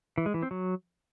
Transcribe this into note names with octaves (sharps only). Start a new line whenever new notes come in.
E3
G#3
E3
C4
F#3